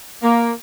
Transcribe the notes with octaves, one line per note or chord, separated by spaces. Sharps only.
A#3